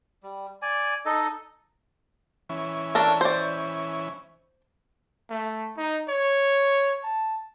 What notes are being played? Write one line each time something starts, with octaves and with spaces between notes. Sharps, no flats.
G3
D5 G#5
D#4 A4 D#5
E3 C#4
D4 A4 A#4
C5 D5
A3
D#4
C#5
A5